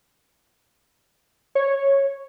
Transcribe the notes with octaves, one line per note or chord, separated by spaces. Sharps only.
C#5